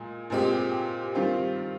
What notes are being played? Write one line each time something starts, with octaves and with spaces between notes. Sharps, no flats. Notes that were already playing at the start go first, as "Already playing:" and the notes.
Already playing: A#2 G#3
A#2 G#3 C4 G4
D#3 G3 C4 F4